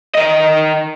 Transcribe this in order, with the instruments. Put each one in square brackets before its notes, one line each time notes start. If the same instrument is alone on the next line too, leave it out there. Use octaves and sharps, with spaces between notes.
[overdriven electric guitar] D#3 D#5